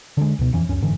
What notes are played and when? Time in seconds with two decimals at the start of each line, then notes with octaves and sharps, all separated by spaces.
0.17 D3 G#3
0.39 C#2 B2
0.52 D#1 F2 E3 C#4
0.69 C#2 F#2 C#4
0.82 F#1 G#2 D3 E3